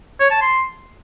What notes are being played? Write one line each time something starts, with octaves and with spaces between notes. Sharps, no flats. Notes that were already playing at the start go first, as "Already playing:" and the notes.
C#5
A5
C6